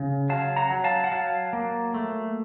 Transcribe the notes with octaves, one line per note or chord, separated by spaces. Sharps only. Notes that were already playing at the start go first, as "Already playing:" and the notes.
Already playing: C#3
F#3 F5 A5
F#5 A#5
F#3
F5 A5
F#5
F#3 F5 A5
A#3
A3